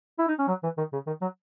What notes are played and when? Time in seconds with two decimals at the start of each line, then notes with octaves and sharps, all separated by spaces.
0.19 E4
0.28 D#4
0.39 C#4
0.48 F#3
0.63 E3
0.78 D#3
0.93 C#3
1.07 D#3
1.21 F#3